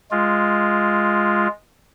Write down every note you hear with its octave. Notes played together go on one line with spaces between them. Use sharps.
G#3 F4